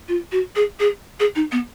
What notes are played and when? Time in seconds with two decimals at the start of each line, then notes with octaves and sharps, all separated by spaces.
0.08 F4
0.32 F#4
0.56 G#4
0.80 G#4
1.20 G#4
1.36 D#4
1.52 B3